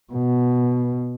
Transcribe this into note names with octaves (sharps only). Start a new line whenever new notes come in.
B2